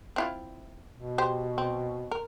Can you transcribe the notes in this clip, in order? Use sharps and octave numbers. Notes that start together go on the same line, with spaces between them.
C4 E4 F4
B2
G4 C5
C4
A#4